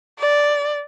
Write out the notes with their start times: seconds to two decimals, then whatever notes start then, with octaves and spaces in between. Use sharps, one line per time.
0.19 D5